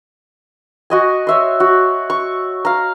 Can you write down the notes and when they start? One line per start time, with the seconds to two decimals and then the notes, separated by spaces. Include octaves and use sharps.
0.90 F#4 D#5 G#5
1.27 C#5 E5 C6
1.60 F#4
2.10 C#6
2.65 F5 A#5